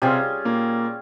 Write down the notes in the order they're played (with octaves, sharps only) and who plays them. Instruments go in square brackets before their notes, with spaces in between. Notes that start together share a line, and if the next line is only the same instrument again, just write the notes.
[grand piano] C3 C4 [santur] G3 C#4 F4 G#4
[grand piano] A#2 A#3